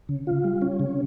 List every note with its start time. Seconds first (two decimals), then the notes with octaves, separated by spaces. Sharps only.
0.09 C#3
0.27 F4
0.44 G3
0.62 C#4
0.80 C#3